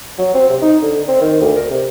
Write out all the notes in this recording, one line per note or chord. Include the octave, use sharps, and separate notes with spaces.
F#3
C4
C3
D#4
D3
C4
D#3
D2
A#4
C3